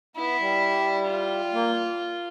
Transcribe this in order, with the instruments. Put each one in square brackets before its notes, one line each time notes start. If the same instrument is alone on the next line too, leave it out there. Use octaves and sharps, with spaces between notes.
[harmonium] B3 [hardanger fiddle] E4
[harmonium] G3
[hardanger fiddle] F4
[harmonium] A#3